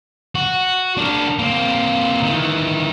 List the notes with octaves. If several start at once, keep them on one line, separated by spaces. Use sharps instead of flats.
F#4
D4 A#4
A#3 C4
D#3 E3